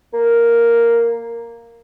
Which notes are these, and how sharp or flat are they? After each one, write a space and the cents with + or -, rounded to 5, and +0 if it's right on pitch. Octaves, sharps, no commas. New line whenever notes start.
A#3 +0